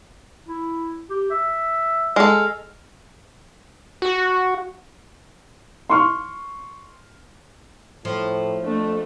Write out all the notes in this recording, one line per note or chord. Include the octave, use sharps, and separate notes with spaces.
E4
G4
E5
G#3 A4 F6
F#4
C6 C#6 F6
A2 F3
F2 A3 D4